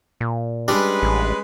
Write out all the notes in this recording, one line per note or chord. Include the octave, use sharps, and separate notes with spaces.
A#2
G3 G#3 C#4 D4 B4
A1